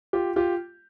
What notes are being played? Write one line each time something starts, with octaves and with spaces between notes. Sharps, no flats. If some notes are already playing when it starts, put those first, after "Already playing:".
F4 G4
F4 G4